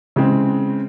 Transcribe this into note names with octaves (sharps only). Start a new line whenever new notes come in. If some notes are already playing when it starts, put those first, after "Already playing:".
C#3 E3 G#3 C4